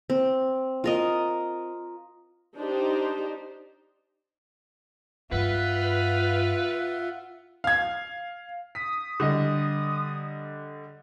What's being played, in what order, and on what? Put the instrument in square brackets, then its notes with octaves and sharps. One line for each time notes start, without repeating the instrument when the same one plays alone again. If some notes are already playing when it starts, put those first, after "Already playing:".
[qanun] C4
F4 A#4 D#5
[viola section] D4 D#4 G4 C5
[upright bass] G2 [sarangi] F4 [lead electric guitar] B4 [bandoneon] E5 F#5
[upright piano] F5 G#6
[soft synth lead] D#6 [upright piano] B6
[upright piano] D3 G3 D#5